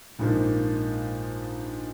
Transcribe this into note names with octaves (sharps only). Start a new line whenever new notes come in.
A#1 G#2 F3 A#3